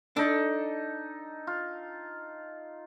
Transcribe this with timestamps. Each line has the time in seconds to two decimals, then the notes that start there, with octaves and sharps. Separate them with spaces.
0.17 D4 D#4 A4
1.47 F4